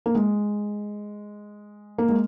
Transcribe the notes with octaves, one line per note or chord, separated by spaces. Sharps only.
A#3
G#3
A#3
G#3